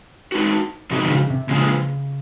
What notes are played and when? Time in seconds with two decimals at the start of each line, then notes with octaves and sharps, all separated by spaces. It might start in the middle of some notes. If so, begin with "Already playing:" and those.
0.32 G#3 D#4 F#4
0.90 C3 F3 G#3 D#4 F#4
1.06 D#3
1.11 C#3
1.30 C3
1.49 A#2 C#3 F3 G#3